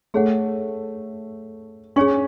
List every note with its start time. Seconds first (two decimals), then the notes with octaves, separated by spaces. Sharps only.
0.14 A3 G#4 C#5 F#5
1.96 C#4 G#4 C#5 G#5 C#6